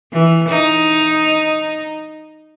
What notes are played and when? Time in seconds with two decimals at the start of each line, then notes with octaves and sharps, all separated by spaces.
0.13 E3
0.49 D#4